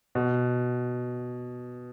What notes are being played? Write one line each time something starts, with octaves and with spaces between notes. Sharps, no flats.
B2